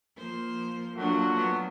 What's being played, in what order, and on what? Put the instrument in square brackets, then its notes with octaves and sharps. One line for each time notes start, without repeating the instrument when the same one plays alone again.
[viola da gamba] F3 A#3 C5
[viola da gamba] F#3 A#3 D4 [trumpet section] A3 F4 F#4
[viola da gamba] F#3 B3